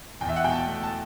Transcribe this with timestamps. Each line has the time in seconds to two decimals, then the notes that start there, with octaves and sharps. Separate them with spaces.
0.21 E2 G5
0.29 E5
0.36 F#5
0.44 B2 G5
0.52 A5
0.67 A3
0.83 A5